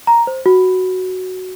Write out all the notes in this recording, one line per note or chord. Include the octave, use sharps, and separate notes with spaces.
A#5
C5
F#4